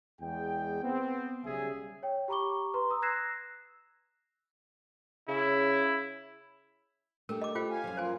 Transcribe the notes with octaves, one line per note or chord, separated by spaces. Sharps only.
E2 G#3 G#4 G5
B3 C4
B1 C#3 G3 G#4 E5 G#5
C#5 G5
G4 A#5 B5 C#6 D6 G7
B4 A#5 C6
A#5 D#6 E6
E6 F#6 G#6 A#6 C7 E7
C#3 E4
A3 D4 G4 A#4
D#5 D6
F4 G4 C5 G5
F5 G#5
F#2 F3
A#3 F4 C5 G#5